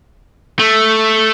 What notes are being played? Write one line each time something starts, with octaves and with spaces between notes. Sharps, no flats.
A3